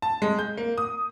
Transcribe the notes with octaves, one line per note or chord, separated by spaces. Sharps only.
A5
G#3
G6
A#3
D#6